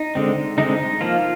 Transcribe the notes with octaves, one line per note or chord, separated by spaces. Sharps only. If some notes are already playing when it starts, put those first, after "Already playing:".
Already playing: D#4
D3 G#3 C4
D3 G#3 C4 D#4
F3 A#3 F4